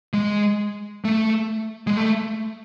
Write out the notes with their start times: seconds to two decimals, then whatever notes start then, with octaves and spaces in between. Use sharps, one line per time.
0.13 G#3
1.05 A3
1.87 G#3
1.97 A3